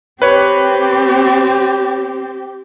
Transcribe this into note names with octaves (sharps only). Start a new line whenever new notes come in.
C4 G4 B4 C#5